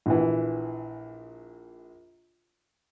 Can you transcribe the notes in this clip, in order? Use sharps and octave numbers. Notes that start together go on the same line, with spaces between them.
A#1 E3